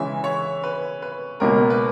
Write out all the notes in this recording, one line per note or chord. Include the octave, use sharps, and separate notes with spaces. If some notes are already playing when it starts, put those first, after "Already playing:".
Already playing: C#3 E3 G#3 E5
C#5
B4
B4
C#2 B2 A#3 A#4
B4